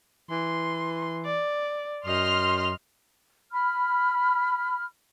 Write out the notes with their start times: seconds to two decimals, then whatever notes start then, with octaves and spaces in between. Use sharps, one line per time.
0.30 E3 C6
1.25 D5
2.06 F#2 D#5 C6 F6
3.52 B5 F6